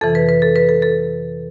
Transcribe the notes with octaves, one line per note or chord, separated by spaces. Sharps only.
F2 C3 E3 A4
B4
B4
A4
B4
A4
A4